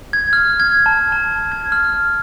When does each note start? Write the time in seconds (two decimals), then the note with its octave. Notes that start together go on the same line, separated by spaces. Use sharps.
0.13 G#6
0.33 F6
0.60 G#6
0.86 A5
1.12 A5
1.52 G#6
1.72 F6